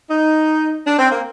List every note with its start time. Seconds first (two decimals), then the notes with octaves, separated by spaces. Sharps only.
0.10 D#4
0.86 D4
0.99 C4
1.11 A#3